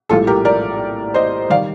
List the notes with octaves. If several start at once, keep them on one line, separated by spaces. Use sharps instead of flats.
A#1 A2 G3 F4 A4
G4 A#4
A#4 D5
C5 D#5
D#3 G3 D5 F5